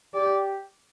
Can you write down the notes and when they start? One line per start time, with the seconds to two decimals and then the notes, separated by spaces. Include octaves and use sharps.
0.14 G4 D5